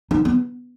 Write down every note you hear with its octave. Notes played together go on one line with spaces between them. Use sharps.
D#4
B3